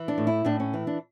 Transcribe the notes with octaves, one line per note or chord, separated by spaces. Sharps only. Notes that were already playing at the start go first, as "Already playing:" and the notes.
Already playing: E3
D4
A2
E4
A2 D4
C#4
E3
D4